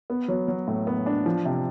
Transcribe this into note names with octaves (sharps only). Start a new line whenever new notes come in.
B3
F#3
F#3
A2
B3
D4
F3
C3